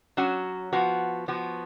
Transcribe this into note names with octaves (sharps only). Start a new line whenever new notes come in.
F#3 C#4 F#4
F3 B3 F#4
F3 B3 F#4